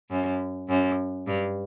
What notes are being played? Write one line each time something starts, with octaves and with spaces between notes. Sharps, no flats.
F#2
F#2
G2